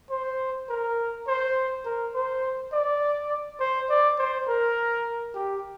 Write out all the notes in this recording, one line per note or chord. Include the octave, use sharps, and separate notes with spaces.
C5
A#4
C5
A#4
C5
D5
C5
D5
C5
A#4
G4